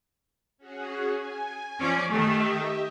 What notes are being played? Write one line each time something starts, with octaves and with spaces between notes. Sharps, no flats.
C#4 F#4 G#4
G#5
F3 C#4 D5
D#3 A3 G4 D#5 E5